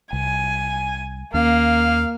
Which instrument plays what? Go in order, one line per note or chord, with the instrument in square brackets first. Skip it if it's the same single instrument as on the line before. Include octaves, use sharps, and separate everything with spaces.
[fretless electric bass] C2 [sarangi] G#5
[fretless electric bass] D#2 C#4 [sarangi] A#3 [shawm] F5